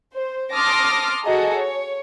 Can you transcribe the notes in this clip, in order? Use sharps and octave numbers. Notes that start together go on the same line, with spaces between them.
C5
A5 C6 D6 D#6 F6 A#6
F#4 G#4 A4 D#5 A#5
C#5